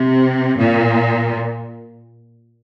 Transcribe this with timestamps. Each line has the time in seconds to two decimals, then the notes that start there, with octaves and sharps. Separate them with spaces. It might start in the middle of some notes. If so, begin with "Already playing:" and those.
Already playing: C3
0.59 A#2